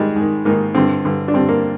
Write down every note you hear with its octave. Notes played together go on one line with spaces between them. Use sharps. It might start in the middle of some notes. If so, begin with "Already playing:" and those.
Already playing: G#2 D#3 G3 G#3
G#2 D#3
G#2 D#3 A#3
G2 D3 C4
G2 D3
D4
G2 D3 C4
A#3